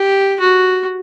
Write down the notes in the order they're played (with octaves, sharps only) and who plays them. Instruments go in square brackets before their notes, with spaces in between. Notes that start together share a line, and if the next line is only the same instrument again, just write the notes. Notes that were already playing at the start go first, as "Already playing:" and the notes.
Already playing: [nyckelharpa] G4
F#4